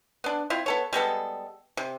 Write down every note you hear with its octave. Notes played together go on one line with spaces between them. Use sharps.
B3 D4
C4 E4 F4
B3 A4 C#5
G3 G#3 B3 A4
C3